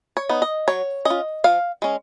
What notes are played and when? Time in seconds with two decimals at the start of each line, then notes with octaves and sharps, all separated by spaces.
0.17 C#5
0.29 B3 D#4
0.42 D#5
0.68 F#3 C#5
1.05 C#4 F4 D#5
1.44 F3 F5
1.82 G#3 C#4